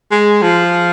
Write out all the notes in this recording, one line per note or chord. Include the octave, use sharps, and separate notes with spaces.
G#3
F3